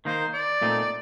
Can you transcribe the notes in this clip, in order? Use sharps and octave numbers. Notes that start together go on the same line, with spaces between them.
D#3 A#3 D#4 C5
D5
A#2 A3 C4 D#4